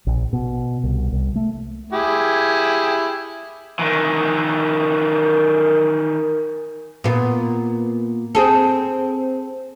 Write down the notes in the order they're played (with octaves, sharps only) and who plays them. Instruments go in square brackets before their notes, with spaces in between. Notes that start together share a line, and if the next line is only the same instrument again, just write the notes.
[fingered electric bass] A#1
B2
C2
C2
A3
[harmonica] E4 G4 G#4
[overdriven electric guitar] D#3 E3
[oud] A#2 B3
C4 G#4 A4